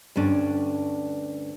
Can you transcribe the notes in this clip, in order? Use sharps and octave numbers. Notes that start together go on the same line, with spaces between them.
D2 G2 C#4 D4